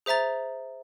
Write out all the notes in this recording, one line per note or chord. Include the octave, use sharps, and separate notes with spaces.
G#4 C5 E5 A#5 A6